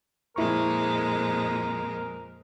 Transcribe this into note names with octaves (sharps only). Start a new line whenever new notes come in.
F2 A#2 G#3 E4 A#4 C#6